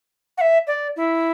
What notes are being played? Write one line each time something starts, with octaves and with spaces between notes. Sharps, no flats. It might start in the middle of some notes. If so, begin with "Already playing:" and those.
F#5
E5
D5
E4